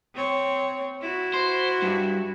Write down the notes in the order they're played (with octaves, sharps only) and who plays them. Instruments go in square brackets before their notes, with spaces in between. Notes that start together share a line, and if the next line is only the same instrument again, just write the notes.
[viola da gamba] C4 C#5
E4 F#4
[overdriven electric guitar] C5
G2